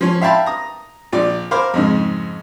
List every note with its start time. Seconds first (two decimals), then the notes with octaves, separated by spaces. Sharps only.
0.01 F3 C#4
0.22 E5 F5 G5 A5 B5
0.46 A#5 D#6
1.13 A#1 F4 D5 D6
1.51 A#4 C5 F5 B5 D6 F6
1.74 F2 G#2 C#3